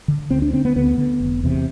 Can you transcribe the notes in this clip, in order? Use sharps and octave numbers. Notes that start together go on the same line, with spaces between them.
D3
D2 C4
D4
D3 C4
B3
D2 B3
D3
F1
E2 C3